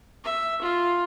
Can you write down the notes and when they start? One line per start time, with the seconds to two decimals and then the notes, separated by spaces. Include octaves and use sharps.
0.24 E5
0.62 F4